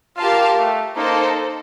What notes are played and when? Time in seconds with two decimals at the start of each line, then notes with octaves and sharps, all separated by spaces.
0.17 F4 G4 A#4 F5 A5
0.56 A3
0.96 A#3 D#4 A4 C5